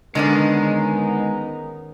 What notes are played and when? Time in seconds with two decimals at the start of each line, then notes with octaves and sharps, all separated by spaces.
0.15 D3 D#3 G#3 B3 C#4 D#4 A#4 D5